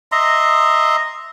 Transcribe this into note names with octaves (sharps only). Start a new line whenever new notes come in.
D#5 E5 A#5 C6